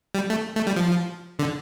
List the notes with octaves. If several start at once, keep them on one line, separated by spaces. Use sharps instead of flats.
G3
A3
A3
G3
F3
D3